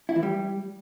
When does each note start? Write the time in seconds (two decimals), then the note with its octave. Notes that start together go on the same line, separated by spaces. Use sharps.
0.09 E4
0.16 E3
0.23 G3